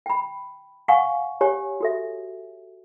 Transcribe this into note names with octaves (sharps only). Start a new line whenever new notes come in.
G5 B5
F5 F#5 G#5 C#6
G4 C#5 G#5
F#4 A4 E5